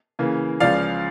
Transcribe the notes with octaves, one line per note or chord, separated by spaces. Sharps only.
C#3 E3 A#3
C#2 C#3 F3 D5 F5